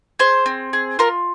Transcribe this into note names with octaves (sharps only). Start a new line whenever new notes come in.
G#4 C5
C4
G#4
F4 A#4